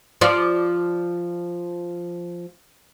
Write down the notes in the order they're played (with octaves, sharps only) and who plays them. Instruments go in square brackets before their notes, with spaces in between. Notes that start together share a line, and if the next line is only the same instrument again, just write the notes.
[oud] F3 F4 D5